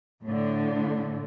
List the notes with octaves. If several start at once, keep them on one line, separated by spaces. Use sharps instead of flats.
A2 D3